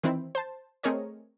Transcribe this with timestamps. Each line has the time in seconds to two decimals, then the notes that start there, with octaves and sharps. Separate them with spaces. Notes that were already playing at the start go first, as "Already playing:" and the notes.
0.03 D#3 E3 C4 E4
0.35 C5 A5
0.83 A3 C4 G#4 A#4 C#5 D#5